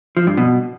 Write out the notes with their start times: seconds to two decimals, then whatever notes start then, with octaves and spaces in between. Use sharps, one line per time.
0.17 F3
0.27 G2
0.37 B2